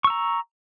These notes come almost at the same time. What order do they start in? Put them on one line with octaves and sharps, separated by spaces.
C#6 E6 A#5